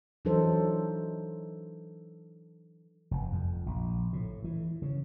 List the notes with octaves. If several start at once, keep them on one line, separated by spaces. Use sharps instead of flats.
E3 F#3 D4 D#4 A4 C5
F1
F2
A#1
A2
E3
C#3